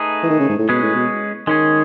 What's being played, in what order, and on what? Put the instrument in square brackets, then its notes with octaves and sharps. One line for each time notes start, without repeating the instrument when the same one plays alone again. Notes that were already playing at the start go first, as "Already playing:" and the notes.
Already playing: [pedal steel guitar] A3 D#4 G#4 B4
[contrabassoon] E3
D#3
C#3
G#2
A2
[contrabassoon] B2 [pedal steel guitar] G#3 C#4 G#4 B4
[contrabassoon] A2
B2
[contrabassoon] D#3 [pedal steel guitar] G#3 C#4 G#4